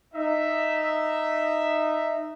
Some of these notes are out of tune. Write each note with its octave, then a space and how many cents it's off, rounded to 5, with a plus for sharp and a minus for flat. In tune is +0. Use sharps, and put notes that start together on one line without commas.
D#4 -10 E5 +0